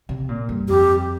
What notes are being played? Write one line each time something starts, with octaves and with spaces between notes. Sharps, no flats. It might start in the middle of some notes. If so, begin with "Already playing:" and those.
C3
A#2
G2
F2 G4